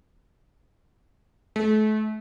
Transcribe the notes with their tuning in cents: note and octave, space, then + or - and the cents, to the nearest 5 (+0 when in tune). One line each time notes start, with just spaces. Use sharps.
A3 -35